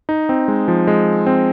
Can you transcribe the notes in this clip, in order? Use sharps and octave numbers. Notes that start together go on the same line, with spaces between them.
D#4
C4
G#3
F3
G#3
C4